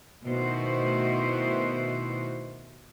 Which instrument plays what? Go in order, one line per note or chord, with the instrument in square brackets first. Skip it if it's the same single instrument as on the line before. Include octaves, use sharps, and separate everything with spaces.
[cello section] B2 D#3 A3 E4 F#4 C5